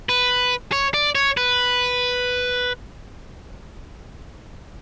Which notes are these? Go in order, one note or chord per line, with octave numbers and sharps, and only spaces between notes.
B4
C#5
D5
C#5
B4